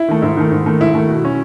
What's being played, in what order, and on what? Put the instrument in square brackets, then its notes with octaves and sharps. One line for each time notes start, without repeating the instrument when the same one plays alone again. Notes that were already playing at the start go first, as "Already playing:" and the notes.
Already playing: [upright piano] E4
[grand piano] D#3 A3
[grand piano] G#2 [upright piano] E4
[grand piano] D#3 A3
G#2
D#3 A3
[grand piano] G#2 [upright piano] E4
[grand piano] D#3 A3
B2
F#3 C#4